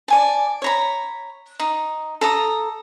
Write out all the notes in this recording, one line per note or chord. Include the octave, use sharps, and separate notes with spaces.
D5 G#5 A5
C#5 A#5 B5
D#4
A4 A#5 D#6